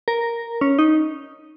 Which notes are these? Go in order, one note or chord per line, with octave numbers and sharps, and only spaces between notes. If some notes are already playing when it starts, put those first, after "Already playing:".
A#4
C#4
D#4